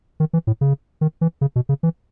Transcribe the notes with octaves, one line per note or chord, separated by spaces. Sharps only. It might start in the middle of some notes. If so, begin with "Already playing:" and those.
D#3
E3
A2
C#3
D#3
E3
C#3
B2
C#3
E3